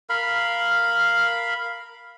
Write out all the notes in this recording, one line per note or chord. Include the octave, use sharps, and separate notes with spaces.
A#4 F5 B5